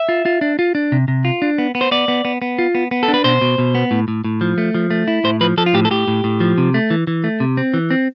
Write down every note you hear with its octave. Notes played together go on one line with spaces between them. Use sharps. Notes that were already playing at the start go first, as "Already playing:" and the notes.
Already playing: E5
F4
F4
D4
F4
D4
C3
C3
F4
D4
B3
B3
C5
B3 D5
B3
B3
B3
F4
B3
B3
A4
D4
B4
B2 C5
B2
B2
B3
A2
A2
A2
F3
A3
F3
A3
E4
A2 C5
F3 B4
F3 A4
F4
A2 G4
A4
A2 G4
A2
A2
F3
C3
A3
E3
E3
A3
C3
C4
E3
C4